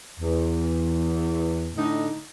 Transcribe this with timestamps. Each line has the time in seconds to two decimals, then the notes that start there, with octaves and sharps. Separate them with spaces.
0.20 E2
1.75 A2 D3 D#4